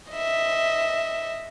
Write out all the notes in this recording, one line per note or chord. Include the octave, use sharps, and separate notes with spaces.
D#5 E5